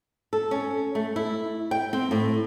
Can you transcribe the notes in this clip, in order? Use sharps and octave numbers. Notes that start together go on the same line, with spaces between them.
A4
C#4
A3
E4
G5
C4
A2